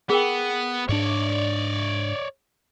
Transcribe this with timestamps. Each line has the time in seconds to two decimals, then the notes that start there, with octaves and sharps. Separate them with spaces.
0.10 B3 G#4 A#4 G5
0.89 G#2 D4 C#5 D5